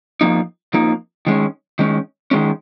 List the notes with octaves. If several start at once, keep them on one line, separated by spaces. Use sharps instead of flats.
F2 F3 A#3 D#4
F2 F3 A#3 D#4
D#3 G#3 C#4
D#3 G#3 C#4
D#3 G#3 C#4